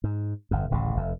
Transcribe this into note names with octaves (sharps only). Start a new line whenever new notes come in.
G#2
G1 F2
D1 A1 A2 C#3
F1 F2